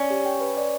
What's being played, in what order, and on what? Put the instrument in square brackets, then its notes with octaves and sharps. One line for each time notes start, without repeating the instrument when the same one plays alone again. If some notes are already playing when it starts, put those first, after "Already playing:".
Already playing: [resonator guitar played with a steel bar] C#4 [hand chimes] D5
[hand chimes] G4
G5
B4
D5